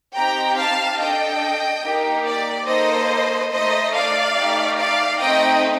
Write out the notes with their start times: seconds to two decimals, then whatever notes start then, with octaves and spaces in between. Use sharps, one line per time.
0.15 C4 D#4 G4 G5 A#5
0.57 F5 A5
0.99 D4 A4 D#5 G5
1.83 A#3 D#4 G4
2.26 D5
2.67 A#3 D#4 A4 C5 D#5
3.52 A3 D#4 A4 C5 D#5
3.93 D5 F5
4.35 A3 D#4 G4
4.78 D5 F5
5.20 A3 C4 D#4 D#5 G5